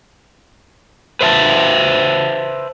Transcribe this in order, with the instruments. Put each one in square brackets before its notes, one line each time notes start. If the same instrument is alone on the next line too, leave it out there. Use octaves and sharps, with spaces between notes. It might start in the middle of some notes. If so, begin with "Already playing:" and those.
[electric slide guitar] B4 C5 E5 A5